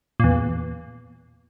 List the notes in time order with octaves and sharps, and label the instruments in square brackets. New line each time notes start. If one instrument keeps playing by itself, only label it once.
[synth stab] E2 A#2